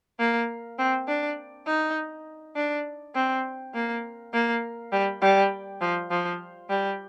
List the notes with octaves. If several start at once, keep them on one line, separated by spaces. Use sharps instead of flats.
A#3
C4
D4
D#4
D4
C4
A#3
A#3
G3
G3
F3
F3
G3